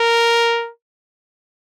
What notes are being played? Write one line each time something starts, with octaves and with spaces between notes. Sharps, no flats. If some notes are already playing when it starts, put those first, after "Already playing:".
Already playing: A#4